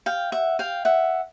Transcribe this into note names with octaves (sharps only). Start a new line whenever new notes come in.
F5 G5
E5 F#5
F5 G5
E5 F#5